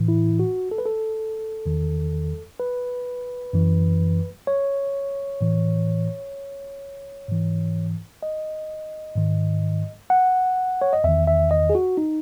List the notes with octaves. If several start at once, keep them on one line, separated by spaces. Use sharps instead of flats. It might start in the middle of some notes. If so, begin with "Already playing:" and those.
Already playing: A2 E3
E4
F#4
A4
B4
A4
E2 D#3
B4
F#2 E3
C#5
A2 E3
G#2 E3
D#5
G#2 D#3
F#5
C#5
D#5
E2 D#3 E5
E5
D#5
G#4
F#4
D#4